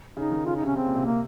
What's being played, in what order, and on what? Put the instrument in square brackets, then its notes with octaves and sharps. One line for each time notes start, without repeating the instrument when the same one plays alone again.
[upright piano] C#3 [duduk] D#4
[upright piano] D#3
[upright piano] C#3 [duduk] F4
[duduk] D#4
[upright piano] C3 [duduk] C#4
[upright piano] C#3 [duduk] C4
[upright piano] A#2
C3
[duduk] A#3